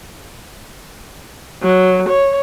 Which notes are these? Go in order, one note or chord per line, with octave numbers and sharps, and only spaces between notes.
F#3
C#5